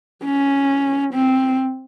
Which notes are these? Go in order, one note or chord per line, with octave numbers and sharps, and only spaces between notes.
C#4
C4